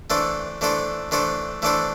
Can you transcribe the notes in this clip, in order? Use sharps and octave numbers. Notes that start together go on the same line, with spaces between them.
E3 A3 D4 A4 C5
E3 A3 D4 A4 C5
E3 A3 D4 A4 C5
E3 A3 D4 A4 C5